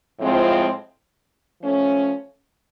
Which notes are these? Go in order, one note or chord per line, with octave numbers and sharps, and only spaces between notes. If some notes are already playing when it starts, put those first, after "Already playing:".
A2 F3 G#3 C4 F4
F3 A3 C#4